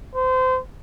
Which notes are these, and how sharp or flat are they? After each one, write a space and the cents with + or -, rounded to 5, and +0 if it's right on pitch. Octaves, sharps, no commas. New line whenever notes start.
C5 -30